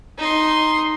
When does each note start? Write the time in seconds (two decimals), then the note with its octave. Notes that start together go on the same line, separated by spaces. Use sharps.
0.18 D#4 C6